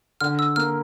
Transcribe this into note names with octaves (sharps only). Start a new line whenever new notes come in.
D3 F6
E6
A#3 F6